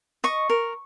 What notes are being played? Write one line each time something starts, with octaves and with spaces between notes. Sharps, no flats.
D#5 C#6
A#4